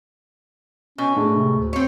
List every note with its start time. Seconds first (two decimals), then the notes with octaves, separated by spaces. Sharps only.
0.98 B2 C#4
1.16 A2 G#3 D4
1.36 C3
1.57 D2
1.73 C4 C#5